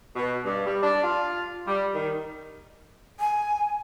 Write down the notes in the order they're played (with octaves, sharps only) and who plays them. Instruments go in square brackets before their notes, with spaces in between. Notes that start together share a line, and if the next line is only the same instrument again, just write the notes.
[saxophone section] B2
G2
G3
D4
F4
G3
D#3
[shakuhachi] G#5